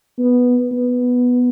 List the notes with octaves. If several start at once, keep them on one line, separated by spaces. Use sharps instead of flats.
B3
B3